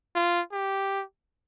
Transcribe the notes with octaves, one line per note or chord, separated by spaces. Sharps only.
F4
G4